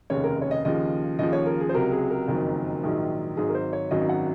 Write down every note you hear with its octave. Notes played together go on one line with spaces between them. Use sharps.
F1 D#2 C#3 C#5
A#4
C#5
D#5
D#2 C#3 F3 D#5
D#2 C#3 F3 D#5
C#5
A#4
G#4
C5
C#2 C3 F#3 A#4
G#4
A#4
F#1 F2 D#3 F#3
A#1 G#2 D#3 F#3
G#1 G#2 F#3 G#4
A#4
C5
C#5
G#1 F#2 D#3 F#3 D#5
F#5